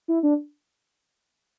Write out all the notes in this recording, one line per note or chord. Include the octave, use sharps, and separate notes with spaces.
E4
D4